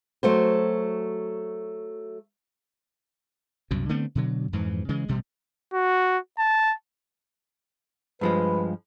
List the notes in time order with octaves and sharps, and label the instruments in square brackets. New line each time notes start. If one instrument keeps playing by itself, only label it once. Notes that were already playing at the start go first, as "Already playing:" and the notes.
[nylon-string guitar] F#3 A3 F#4 C5
[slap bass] C2 F#2 B2
D3 A3 B3 C4
B2 D3 F#3
F2 G#2 E3 F3
C#3 E3 G#3
A1 B2 G3
[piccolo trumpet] F#4
A5
[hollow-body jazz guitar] G2 F3 G#3 [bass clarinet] B4